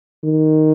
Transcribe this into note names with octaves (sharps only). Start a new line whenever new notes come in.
D#3